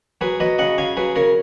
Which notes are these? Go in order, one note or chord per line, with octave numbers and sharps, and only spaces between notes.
F#3 G#4 B4
F#3 B4 D#5
C#3 D#5 F#5
C#3 F5 G#5
F#3 G#4 B4
C#3 A#4 C#5